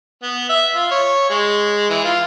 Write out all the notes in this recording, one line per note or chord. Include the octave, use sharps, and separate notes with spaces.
B3
E5
F4
C#5
G#3
E3
F4